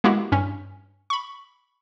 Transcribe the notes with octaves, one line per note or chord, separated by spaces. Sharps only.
G#3 A#3 B3 E4 F#4 G4
G2 C#4
B5 C#6